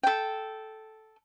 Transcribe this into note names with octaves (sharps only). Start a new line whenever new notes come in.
A4 G5